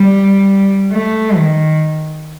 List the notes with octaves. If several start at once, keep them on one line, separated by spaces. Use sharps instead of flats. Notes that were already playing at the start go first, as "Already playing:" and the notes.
Already playing: G3
A3
D#3